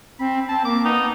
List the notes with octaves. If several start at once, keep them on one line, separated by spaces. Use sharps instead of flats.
C4 B5
C4 A5
A#3 D6
B3 D#4